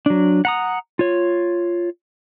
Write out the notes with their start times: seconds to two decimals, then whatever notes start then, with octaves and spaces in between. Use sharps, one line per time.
0.06 F#3 D4
0.45 F#5 A#5 D#6
0.99 F4 C#5